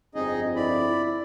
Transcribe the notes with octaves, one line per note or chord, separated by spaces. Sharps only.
G1 F2 C4 D#4 G#4 D#5
E4 D5 B5